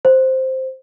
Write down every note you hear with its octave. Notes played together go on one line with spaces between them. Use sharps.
C5